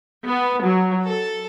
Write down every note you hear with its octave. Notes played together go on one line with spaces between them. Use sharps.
B3
F#3
A4